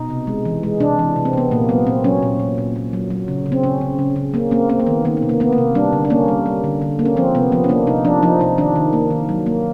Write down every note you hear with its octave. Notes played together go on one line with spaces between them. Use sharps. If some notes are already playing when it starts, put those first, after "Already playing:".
Already playing: B2 D#4
C3
G#3
E3
G#3
C3 D4
E3
C3
C4
C3 B3
A#2 A#3
F#3 B3
A#2 C4
F#3 C#4
A#2
A#2
A#2
A#2
F#3
F#3
C#3
C#3
C4
C#3 C#4
C#3
C#3
C#3
A#3 C#4
A#3 C4
A#3 C4
A#3
D#3 B3
D#3 A#3
B3
C3
A#3
A#3 B3
A#3
C3
G3 D4
D3
D4
A#3 C#4
G3
G3
D3
D3
A#3
C#4
F3 C4
C3 B3
F3 B3
C#4
A#3 D4
C3 D#4
F3 D4
F3 D#4
C3 D#4
D#3 D4
D#3
A#3
D#3
F#3
A#3